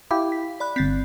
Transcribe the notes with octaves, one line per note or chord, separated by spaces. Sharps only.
E4 G4 F5
B6
D5 B5 F#6
G1 C4 A6 B6